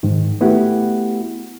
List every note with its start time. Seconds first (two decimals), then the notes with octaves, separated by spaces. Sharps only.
0.03 G#2 D#3
0.41 A3 B3 E4 F#4 G4 F#5